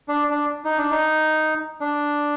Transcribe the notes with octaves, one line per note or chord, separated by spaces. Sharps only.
D4
D4
D#4
D4
D#4
D4